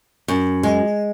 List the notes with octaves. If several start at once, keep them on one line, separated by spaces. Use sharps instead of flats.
F#2
G#3